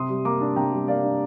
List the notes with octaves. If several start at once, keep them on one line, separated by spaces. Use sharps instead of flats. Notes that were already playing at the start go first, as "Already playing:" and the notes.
Already playing: C3 C6 D#6
G3
A#3 A#5 D6
D4
C3 G5 A#5
G3
A#3 D5 F5
D4